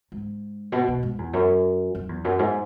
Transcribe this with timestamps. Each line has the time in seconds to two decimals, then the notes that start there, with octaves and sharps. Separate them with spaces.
0.12 G#2
0.72 B2
0.88 B2
1.03 G#2
1.18 E2
1.33 F#2
1.95 F#2
2.09 E2
2.24 F#2
2.39 G#2